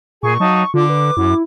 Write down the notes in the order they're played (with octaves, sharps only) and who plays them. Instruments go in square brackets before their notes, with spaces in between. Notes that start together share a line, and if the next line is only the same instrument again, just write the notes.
[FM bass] A#2 [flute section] G#4 G#5 [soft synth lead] C#6
[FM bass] F#3 [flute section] D#4 F5 A5
[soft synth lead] C#6
[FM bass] D3 [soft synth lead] F4 [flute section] D6
[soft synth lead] B4
[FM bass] F#2 [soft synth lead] E4